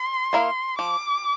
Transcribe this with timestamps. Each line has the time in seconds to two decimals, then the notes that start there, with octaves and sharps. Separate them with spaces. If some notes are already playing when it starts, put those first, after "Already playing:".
Already playing: C6
0.33 A#3 E4 A#4 F5
0.78 F3 D6